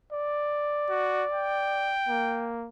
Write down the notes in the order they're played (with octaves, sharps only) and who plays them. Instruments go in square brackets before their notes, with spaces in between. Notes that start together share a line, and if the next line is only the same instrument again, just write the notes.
[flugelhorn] D5
[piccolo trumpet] F#4
G5
[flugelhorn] A#3